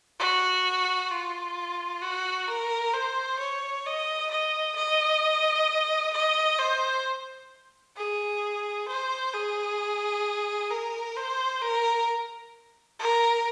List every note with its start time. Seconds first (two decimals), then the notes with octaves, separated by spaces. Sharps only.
0.19 F#4
1.11 F4
2.02 F#4
2.48 A#4
2.94 C5
3.39 C#5
3.86 D#5
4.31 D#5
4.76 D#5
6.13 D#5
6.59 C5
7.97 G#4
8.88 C5
9.34 G#4
10.71 A#4
11.17 C5
11.62 A#4
12.99 A#4